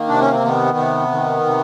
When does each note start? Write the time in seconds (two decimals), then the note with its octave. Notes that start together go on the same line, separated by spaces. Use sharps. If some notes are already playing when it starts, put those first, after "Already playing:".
Already playing: D#3 A#3
0.08 C3 D4
0.20 C#4
0.32 C4
0.43 D#3 B3
0.77 C3
1.11 D#3
1.45 C3